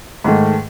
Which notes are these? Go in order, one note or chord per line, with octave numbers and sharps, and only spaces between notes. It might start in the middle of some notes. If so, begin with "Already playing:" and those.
G#2 D#3 A3